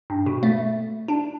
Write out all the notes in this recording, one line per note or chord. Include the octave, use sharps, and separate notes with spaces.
G2
B2
A3
D4